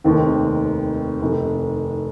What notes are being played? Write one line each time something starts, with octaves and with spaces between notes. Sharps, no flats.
F1 D#2 D#3 C4
F1 F2 D#3